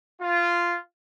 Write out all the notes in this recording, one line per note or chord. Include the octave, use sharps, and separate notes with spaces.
F4